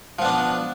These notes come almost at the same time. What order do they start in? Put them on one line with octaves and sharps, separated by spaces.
F3 B3 D4